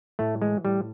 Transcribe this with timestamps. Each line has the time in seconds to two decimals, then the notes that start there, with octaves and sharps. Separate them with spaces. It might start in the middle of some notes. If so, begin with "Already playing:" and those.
0.19 A2 A3
0.42 E3 G#3
0.65 A2 G3